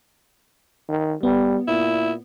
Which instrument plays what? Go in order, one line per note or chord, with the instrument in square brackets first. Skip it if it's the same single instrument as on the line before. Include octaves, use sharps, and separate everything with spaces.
[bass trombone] D#3
[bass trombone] G3 [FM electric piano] B3
[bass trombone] A#2 [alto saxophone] E4